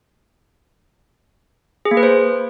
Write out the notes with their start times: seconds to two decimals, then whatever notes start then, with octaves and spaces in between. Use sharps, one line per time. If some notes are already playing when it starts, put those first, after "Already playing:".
1.85 G#4
1.91 A#3
1.97 B4
2.03 C5